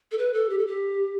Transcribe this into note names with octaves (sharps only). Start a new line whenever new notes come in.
A4
B4
A4
G4
A4
G4